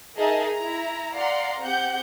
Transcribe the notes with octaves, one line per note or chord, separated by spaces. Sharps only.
D#4 G#4 A#4 D#5 E5 A5
E4 A#5
D5 F5 F#5 A#5 C6
C4 G4 F#5 G6